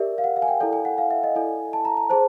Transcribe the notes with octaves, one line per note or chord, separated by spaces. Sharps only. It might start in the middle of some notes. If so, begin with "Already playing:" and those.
Already playing: G4 A#4 D5 E5
F5
F#5
F5
G#5
G5
E4 A4 D5
G#5
F#5
F5
E5
D#5
E4 A4 D5 G#5
A5
A#5
A#5
G#4 C5 A5